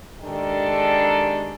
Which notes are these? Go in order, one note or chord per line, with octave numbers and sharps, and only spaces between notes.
D#3 G#3 D4 G4 A4